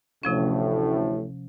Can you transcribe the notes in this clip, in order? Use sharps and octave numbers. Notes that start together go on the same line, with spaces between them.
A1 D2 A2 C3 F3 C#4